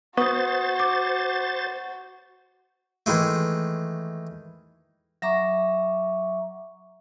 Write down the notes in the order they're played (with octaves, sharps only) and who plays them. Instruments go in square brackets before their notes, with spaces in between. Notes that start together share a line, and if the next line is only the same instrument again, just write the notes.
[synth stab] B3 [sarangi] F#4 [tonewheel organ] C5 A6 [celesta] C#6 D#6
[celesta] D6
[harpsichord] D#3 E3 G#3 A3
[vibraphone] F#3 E5 A#5 C#6 D6